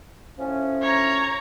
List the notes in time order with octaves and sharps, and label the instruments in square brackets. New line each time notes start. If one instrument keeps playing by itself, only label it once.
[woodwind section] A2 F3 C#4
[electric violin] C#5 A#5